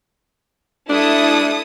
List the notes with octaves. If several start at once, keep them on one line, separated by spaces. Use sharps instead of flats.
D4 E4 A4 D#6